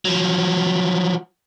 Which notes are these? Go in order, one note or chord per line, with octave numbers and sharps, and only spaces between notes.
F3 F#3